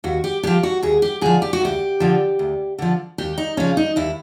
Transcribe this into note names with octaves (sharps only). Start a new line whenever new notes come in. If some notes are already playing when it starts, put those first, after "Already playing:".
D#2 F#4
G4
D3 F3 G4
F#4
D#2 G#4
G4
D3 F3 G#4
G4
F#4
D2 G4
D3 F3
D2
D3 F3
D#2 G4
D#4
C#3 F3 C#4
D#4
D#2 E4